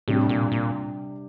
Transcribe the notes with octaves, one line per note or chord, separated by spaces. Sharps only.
A2 C3 G3 D4 G4
A#2
A#2